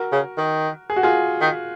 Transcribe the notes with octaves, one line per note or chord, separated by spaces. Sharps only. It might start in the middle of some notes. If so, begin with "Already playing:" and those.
Already playing: F#4 A#4
C#3
D#3
G#4
F#4
F4 G#4
D#3